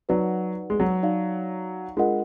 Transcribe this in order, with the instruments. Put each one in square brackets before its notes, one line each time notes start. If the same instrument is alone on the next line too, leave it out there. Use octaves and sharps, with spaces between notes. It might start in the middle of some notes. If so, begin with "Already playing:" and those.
[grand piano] F#3 [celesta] D#4 F#4 B4 D5 F#5
[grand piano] G#3
F#3
[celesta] D#4 F#4 D5 F5
[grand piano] G#3 [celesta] D4 F4 A#4 D#5 F#5